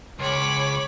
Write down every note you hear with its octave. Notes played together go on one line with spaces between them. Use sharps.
C#2 C#5 B5 D6